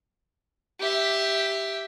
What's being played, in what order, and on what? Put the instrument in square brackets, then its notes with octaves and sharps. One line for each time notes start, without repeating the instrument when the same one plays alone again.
[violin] G4 E5